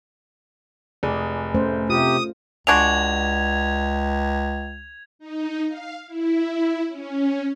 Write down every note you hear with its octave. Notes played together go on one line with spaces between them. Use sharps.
F1 G#4 D5
A3 C#4 C5
C3 F4 G4 D#6
C#2 G#3 D4 F#4 G#6 F7
D#4
F5
E4
C#4